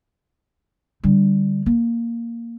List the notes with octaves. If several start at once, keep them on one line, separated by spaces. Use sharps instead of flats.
D3 G3
A#3